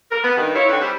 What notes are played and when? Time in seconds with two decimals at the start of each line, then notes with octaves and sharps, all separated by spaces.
0.11 A#4
0.23 B3
0.37 G2 D#3
0.54 E4 F4 C#5
0.68 D3 C4 D4 D#4 B4 C#5
0.81 G3 C#4 E4 G4 C5